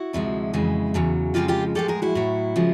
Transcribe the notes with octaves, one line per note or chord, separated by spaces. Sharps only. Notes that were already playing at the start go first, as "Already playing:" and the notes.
Already playing: E4 F#4
D2 C3 F3 G#3
F2 C#3 E3 G#3
E2 C#3 F#3
F2 C#3 F3 G#3 F4 G4
F4 G4
A2 F3 G#3 G4 A4
G#4 A#4
E4 F#4
A2 F#3
C#3 F3 G#3